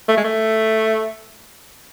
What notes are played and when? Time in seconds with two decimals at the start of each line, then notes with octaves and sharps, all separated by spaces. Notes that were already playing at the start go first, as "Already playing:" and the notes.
0.09 A3
0.17 G#3
0.24 A3